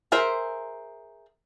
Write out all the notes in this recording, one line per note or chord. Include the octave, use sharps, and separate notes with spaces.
G#4 A#4 C5 E5